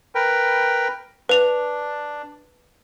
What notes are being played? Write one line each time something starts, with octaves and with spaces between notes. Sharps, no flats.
A#4 B4 G5
D4 B4 F7